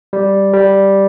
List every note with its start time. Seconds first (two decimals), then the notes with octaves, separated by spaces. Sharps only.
0.13 G3
0.53 G3